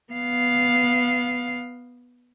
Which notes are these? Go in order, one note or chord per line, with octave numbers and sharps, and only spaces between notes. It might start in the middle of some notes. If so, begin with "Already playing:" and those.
B3 F5